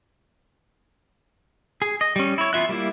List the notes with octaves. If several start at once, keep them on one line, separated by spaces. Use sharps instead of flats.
G#4
D#5
G3 C#4
E4 C#5
E3 B3 F4 E5 F#6
G3 A#3 E4